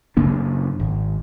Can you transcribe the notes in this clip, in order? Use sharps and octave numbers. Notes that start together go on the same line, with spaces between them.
F#2 C#3 A#3 D4
G#1